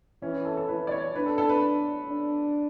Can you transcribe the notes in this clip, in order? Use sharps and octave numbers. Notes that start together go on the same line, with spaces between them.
E3 C#4
E4
A4
A4
E3 B4
D5
C#5
D4 B4
A4
A4
B4
D4